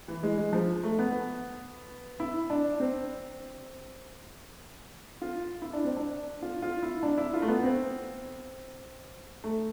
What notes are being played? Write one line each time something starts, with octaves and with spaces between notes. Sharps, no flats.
E3
G#3
G#3
F3
A3
B3
E4
D4
C4
F4
E4
D4
C4
D4
F4
F4
E4
D4
E4
F4
A3
B3
C4
A3